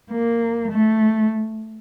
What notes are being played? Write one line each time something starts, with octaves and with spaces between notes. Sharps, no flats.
A#3
A3